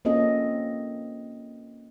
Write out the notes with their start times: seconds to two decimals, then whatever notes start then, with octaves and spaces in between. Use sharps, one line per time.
0.05 A#3 C4 C#4 F4 A4 D#5